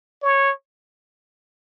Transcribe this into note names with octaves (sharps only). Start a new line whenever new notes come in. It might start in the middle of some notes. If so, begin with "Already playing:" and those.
C#5